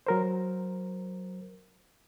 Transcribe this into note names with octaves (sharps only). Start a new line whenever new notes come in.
F#3 A#4 C5